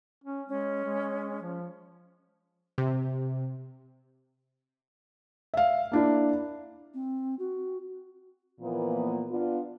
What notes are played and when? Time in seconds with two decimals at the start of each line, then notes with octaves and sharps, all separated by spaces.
0.24 C#4
0.49 G#3 C#4
0.85 G#3
1.42 F3
2.78 C3
5.54 E5 F5
5.91 A#3 D4 E4
6.94 C4
7.39 F#4
8.60 A#2 E3 F3 A#3 B3
9.31 B3 D4 F4